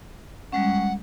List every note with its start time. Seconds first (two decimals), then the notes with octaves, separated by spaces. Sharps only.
0.52 G3 G#3 C#4 F#5